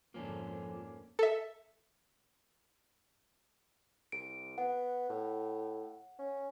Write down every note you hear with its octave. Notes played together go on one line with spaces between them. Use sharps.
F2 G#2 D3 F3 A#3 C#4 D4
A4 E5
C2 D7
B3 F#5
A2
C#4